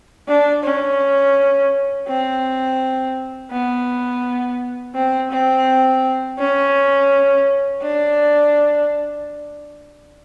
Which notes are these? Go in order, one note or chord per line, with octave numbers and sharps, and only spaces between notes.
D4
C#4
C4
B3
C4
C4
C#4
D4